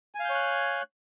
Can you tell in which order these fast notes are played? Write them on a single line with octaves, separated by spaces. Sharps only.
G#5 F5 G6 C#5 F#6